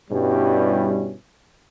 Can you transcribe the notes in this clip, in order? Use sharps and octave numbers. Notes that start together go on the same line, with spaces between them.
G2 B2 G3 C#4 E4